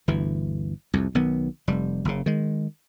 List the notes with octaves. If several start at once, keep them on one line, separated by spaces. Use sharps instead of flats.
G1 D2 E3
C2 F2
B1 D#3 B3
F1 G3
F#1 C#3
D#3 G#3